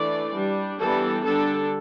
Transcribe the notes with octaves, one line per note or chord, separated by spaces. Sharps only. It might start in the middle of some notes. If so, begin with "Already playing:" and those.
Already playing: E3 A3 D4 D5
G3 D4
E3 G3 B3 D4 A4
D3 G3 D4 A4